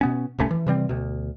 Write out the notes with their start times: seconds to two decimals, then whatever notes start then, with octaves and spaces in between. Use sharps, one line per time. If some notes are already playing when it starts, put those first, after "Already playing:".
0.01 B2 B3 C#4
0.39 D#1 C2 A3 C#4
0.51 E3
0.67 C3 E3 G3 C4
0.89 D2 B2